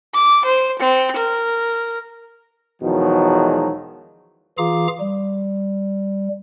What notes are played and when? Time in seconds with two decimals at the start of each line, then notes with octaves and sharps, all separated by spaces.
0.14 D6
0.45 C5
0.79 C4
1.16 A#4
2.82 E2 B2 D#3 F3 F#3 G#3
4.58 E3 F4 G#4 F5 A#5 D6
5.00 G3